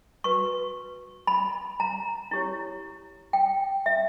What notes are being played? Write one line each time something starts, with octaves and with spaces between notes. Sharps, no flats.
F#4 B4 C#6
B5
A#5
E4 G4 C#5
G5
E5